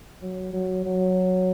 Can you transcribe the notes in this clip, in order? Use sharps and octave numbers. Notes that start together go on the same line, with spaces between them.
F#3
F#3
F#3